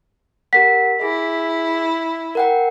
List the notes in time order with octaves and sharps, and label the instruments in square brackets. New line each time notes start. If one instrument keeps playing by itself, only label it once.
[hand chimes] G4 A#4 F#5 [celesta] B6
[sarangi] E4 [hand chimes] G#4
[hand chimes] A#4 F#5 G5